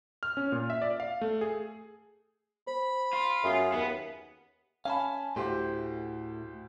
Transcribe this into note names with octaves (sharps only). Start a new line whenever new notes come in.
F6
C#4
A#2
E5
D5
F5
A3
G#4
C5 B5
F4
F#2 G#4 E5 G#5 C7
D#2 B3
C#4 F5 G#5 A5 B5
D2 A2 G4 C5